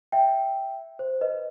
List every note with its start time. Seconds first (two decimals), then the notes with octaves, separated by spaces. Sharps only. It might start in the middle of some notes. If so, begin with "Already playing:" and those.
0.12 E5 G5
0.99 C5
1.21 B4 D#5